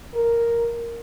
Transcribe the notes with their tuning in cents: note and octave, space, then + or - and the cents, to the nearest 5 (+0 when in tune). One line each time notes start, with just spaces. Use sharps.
A#4 +0